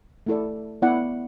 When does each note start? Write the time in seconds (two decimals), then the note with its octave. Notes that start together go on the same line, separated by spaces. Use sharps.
0.26 A3 E4 A4 D5
0.82 B3 E4 D5 F#5